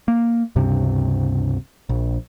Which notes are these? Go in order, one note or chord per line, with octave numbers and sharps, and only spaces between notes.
A#3
C#2 G2 C3
A#1